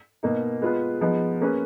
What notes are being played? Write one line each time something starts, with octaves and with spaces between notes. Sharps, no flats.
B2 A#3 D#4
G#3 B3 F4 G#4 B4
F3 G#3 B3 D#4
A#3 C#4 G#4 B4